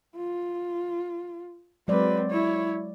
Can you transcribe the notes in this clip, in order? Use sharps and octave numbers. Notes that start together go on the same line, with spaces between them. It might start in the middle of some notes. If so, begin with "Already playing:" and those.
F4
F#3 G#3 C4 B4 D5
E4 C#5